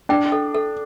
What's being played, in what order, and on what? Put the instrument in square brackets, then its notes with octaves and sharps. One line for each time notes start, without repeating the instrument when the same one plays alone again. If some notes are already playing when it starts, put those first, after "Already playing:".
[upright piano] D4 [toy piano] G5
[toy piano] A4
A4